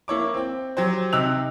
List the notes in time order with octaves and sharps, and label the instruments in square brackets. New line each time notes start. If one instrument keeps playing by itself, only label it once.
[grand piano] A#3 E4 C#5 D6
C4 G5
F#3 G4 C5
C3 D#4 G5 E6 F#6 F7